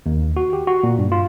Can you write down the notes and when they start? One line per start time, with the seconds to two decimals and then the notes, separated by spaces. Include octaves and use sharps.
0.06 D#2
0.37 F#4
0.53 G4
0.67 F#4
0.83 A#2
0.98 G2
1.12 F4